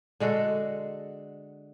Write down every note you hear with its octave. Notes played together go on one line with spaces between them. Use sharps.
D3 G#3 F#4 A4